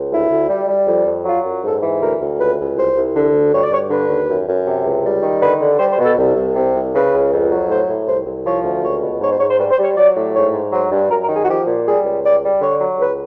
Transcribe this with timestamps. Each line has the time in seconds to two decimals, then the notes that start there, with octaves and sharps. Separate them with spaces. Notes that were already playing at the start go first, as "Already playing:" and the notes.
Already playing: C#2
0.11 D2 E4
0.30 D2
0.49 G3
0.68 G3
0.87 F2
1.06 F2
1.25 F#3 F4
1.45 F#2
1.63 G#2 A4
1.82 E3
2.01 D2 A#4
2.19 D2
2.39 C#2 B4
2.58 C#2
2.76 C2 C5
2.95 C2
3.15 D3
3.33 D2
3.52 G2 C#5
3.62 D5
3.71 G2 C#5
3.90 D3 B4
4.09 D#2
4.28 F#2
4.47 F#2
4.66 C3
4.85 C#2
5.04 G3
5.22 D#3
5.41 D3 B4
5.60 D3
5.79 G3 C5
5.92 C5
5.99 B2
6.05 A4
6.18 C2
6.36 C2
6.55 C3
6.74 C2
6.93 C#3 B4
7.12 C#2
7.31 F2
7.50 F#3
7.69 A2 C5
7.87 A2
8.06 C2 C5
8.26 C2
8.45 F3 C#5
8.63 D2
8.82 C#2 C#5
9.01 B2
9.20 G#2 C#5
9.29 C5
9.38 G#2 C#5
9.49 C5
9.58 G3 B4
9.71 C5
9.78 G3
9.84 C#5
9.97 F#3 D5
10.16 A2
10.34 G#2 C#5
10.53 G#2
10.71 F#3 C5
10.91 G2
11.10 F#2 A#4
11.22 A#4
11.29 D#3
11.35 G#4
11.43 F#4
11.47 F3 G4
11.67 A#2
11.85 G3 G#4
12.05 C#2
12.23 G3 D5
12.42 G3
12.61 D3 C#5
12.80 F#3
12.99 C#2 B4